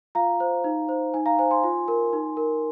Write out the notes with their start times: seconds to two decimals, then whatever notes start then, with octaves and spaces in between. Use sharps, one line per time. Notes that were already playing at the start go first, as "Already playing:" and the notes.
0.15 F4 F5 A#5
0.40 C5
0.64 D#4
0.89 C5
1.14 D#4 G#5
1.26 F5 A#5
1.39 C5 G#5
1.50 G#5 C6
1.64 F4
1.88 A#4
2.13 D#4
2.37 A#4